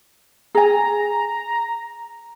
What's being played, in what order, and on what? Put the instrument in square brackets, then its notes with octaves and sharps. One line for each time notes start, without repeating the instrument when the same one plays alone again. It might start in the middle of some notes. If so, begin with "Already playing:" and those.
[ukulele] G#4 G#5 [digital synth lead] A#5